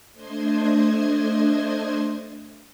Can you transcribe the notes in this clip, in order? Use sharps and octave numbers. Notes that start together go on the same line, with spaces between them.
A3 D4 C5 D#5 C6 G#6